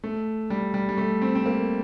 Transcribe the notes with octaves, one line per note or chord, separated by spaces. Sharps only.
A3
G3
G3
G3
A3
C4
C4
A#3